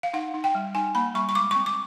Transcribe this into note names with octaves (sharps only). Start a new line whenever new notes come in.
F5
D#4 F#5
D#4
G5
G3
D#4 G#5
A#3 B5
G3 C#6
C#6
G#3 D6
C#6
C4
D6